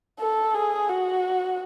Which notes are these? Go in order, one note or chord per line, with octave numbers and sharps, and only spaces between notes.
A4
G#4
F#4